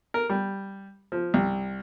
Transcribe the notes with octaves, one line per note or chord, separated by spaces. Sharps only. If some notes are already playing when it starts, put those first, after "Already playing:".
A#4
G3
F3
C2